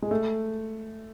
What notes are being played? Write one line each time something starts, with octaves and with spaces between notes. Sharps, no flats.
G#3
A3